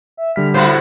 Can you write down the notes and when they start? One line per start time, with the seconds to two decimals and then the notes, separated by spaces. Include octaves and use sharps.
0.17 E5
0.36 D3 G3 F6 B6
0.54 A2 E4 F#4 C5 B5